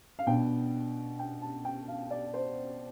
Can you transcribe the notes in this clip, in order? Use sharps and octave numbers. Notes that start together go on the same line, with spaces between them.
F5
B2 B3 D4 G5
G5
A5
G5
F5
D5
C5